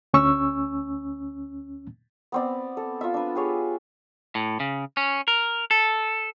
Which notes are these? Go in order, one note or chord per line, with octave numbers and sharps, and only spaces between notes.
D2 C#4 C#6 E6
B3 C4 D5
A4
F4 E5
D4 B4
G4 G#4 C#5
A2
C#3
C#4
A#4
A4